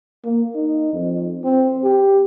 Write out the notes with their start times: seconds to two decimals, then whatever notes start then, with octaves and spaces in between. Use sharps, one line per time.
0.25 A#3
0.55 D#4
0.93 F2
1.44 C4
1.83 G4